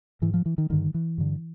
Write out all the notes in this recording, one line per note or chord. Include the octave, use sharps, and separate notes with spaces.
G#2 E3
F3
E3
D#3
G2 D3 D#3
E3
G2 D3